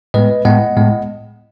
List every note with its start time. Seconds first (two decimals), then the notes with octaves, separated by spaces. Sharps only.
0.14 A2 G#3 B3 B4 D#5
0.45 A2 G#3 B3 D#5 F#5
0.77 A2 G#3 B3